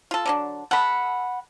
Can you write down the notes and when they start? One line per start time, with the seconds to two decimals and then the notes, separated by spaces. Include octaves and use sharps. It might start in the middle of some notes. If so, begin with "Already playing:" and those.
0.11 F4 A4
0.26 D3 F#3 D4
0.71 A4 F#5 B5